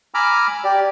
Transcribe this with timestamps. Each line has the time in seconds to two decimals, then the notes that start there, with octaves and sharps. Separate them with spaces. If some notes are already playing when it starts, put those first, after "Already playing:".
0.14 G#5 A#5 B5 D6 E6 F6
0.64 G4 D5